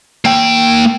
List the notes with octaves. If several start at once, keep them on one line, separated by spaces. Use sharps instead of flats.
A#3 G5